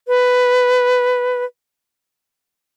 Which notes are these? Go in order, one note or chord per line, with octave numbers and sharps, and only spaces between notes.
B4